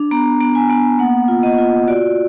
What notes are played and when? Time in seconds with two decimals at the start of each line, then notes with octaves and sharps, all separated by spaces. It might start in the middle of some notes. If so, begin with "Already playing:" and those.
Already playing: D4
0.11 B3 A#5
0.40 B3
0.55 G#5
0.70 B3
0.99 A#3 F#5
1.28 F4
1.43 D#5
1.58 F4
1.88 F#4 D5